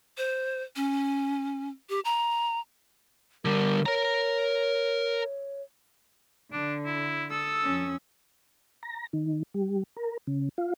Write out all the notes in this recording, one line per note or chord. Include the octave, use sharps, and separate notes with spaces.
C5
C#4
G4
A#5
D3 G3 A#4
A#4 C#5 A#5
D3 D4
E4
A4 D#6 E6
F2 C#4
A#5
D#3
G3
A#4
C#3
F4